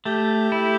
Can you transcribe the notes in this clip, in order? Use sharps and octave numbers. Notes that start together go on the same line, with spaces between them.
A3 G4
E4